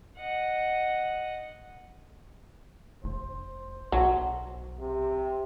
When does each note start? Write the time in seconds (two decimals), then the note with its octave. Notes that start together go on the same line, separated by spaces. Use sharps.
0.17 D#5 F#5
3.04 F1 C5
3.92 B1 F#3
4.79 C3